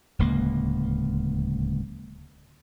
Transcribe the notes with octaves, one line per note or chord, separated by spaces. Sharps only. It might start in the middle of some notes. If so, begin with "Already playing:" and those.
D1 C#2 A#3